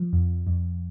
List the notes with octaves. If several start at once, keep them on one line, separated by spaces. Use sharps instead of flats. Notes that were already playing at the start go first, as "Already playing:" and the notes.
Already playing: F3
F2
F2